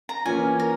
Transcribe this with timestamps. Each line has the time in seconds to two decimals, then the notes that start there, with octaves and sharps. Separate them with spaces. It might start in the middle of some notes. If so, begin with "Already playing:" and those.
0.09 A#5
0.25 E3 A#3 C#4 F4 G#5
0.60 A#4